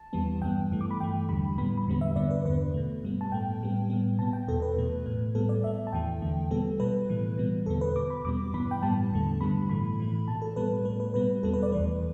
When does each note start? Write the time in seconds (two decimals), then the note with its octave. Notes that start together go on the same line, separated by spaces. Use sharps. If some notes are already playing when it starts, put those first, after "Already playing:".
Already playing: A5
0.13 E2 E3 G3 B3
0.42 G2 G3 B3 G5
0.71 G2 E3 A3
0.81 D6
0.91 B5
1.00 G2 E3 A3 G5
1.29 E2 D3 G3 B5
1.58 A2 E3 G3 B3 B5
1.77 B5
1.86 E2 D3 G3 B3
2.01 E5
2.16 G2 D3 B3 D5
2.31 B4
2.45 E2 D3 B3 B4
2.74 B2 A3
3.03 G2 G3 B3
3.21 A5
3.32 A2 A3 G5
3.61 A2 G3 B3
3.90 A2 G3 B3
4.19 B2 B3 A5
4.33 G5
4.48 E2 B2 B3 A4
4.62 B4
4.77 E2 B2 A3
5.06 A2 A3
5.35 A2 G3 B3 A4
5.49 D5
5.63 A2 A3 E5
5.87 A5
5.93 E2 E3 A3 G5
6.22 E2 D3 A3
6.51 B2 G3 B3 A4
6.80 B2 G3 B3 B4
7.09 A2 E3 A3
7.38 B2 G3 B3
7.66 E2 D3 B3 A4
7.81 B4
7.96 B2 B3 D6
8.10 B5
8.24 E2 B2 G3 B3 D6
8.54 G2 E3 B3 B5
8.71 G5
8.82 A2 E3 G3 B3 A5
9.11 E2 D3 A3
9.41 G2 D3 G3 B3 B5
9.69 A2 E3 A3 B5
9.99 A2 E3 A3
10.28 B2 A3 A5
10.42 A4
10.56 A2 G3 B3 B4
10.85 A2 A3 B4
11.00 B4
11.14 B2 G3 B3 B4
11.43 E2 B2 G3 B3 A4
11.54 B4
11.63 D5
11.72 E2 E3 A3 B4